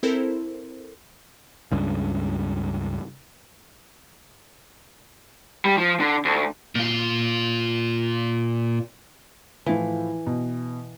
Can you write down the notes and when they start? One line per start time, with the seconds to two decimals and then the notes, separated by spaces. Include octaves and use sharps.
0.03 C4 E4 A4 A#4 C5
1.72 C#2 G2 C#3
5.65 G3
5.78 F3
6.00 D3
6.25 D2
6.75 A#2 F4
9.66 A2 E3 F3
10.26 B2